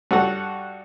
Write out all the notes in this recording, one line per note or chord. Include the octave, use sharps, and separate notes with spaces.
G2 F#4 A4 F#5